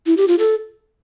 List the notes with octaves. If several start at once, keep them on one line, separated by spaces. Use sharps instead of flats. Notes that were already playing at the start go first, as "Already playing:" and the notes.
E4
G4
F4
A4